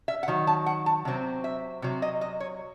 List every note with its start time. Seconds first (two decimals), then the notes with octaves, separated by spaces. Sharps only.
0.08 E5
0.23 F#5
0.28 D#3 F#3
0.47 A5
0.66 F#5
0.86 A5
1.05 C3 F#3 C4
1.44 E5
1.82 C3 F#3
2.02 D#5
2.21 D#5
2.40 C#5